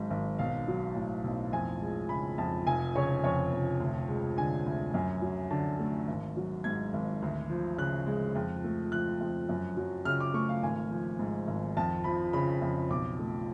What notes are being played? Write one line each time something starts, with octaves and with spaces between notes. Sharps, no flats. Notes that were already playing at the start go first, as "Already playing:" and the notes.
Already playing: G#1 G#2 F#3
G#1
B1 F5
F#3
A2
B1
F2 G#5
G#3
C#3 B5
F2 A5
F1 G#5
C#3 C#5
F2 C#5
F1
D2
G#3
D3 G#5
D2
F#2
F#3
D3 A5
A3
G#1
F#3
G#2 G#6
G#1
D2
F3
C#3 F#6
G#3
F2
A3
F3 F#6
F2
F#2
F#3
C#3 F6
D6
A3 C#6
F5
G#1 G#5
F3
G#2
G#1
F2 A5
F3 B5
C#3 B5
F2
B1 D6
A3